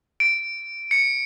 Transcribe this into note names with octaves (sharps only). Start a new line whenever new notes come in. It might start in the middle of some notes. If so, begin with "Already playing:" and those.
D7
C#7